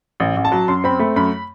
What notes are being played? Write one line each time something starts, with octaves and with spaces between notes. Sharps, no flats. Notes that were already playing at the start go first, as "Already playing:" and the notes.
A1
A1
A5
F#3
F#2 C6
C4 B5
A3 B5
F#2 B5